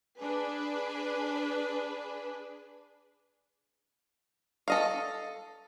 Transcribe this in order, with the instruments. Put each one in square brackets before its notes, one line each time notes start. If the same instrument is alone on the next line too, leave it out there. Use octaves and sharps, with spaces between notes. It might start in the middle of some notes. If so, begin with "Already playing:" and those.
[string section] D4 G#4 B4
[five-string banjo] A4 D#5 F5